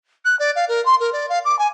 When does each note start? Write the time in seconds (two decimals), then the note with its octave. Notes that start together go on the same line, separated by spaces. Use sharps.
0.25 F#6
0.39 D5
0.55 F5
0.68 A#4
0.85 C6
1.00 A#4
1.13 D5
1.29 F5
1.45 D6
1.59 G#5